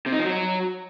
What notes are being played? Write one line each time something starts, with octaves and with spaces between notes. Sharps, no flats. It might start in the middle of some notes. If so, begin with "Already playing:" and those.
C3
D#4
F3
F#3